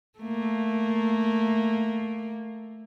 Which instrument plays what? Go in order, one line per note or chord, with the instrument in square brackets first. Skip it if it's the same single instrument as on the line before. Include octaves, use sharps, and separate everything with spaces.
[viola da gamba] A3 A#3